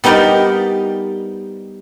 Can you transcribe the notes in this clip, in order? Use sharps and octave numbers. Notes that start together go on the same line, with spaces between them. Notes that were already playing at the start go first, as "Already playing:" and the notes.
G3 B3 D#4 G4 A#4 D5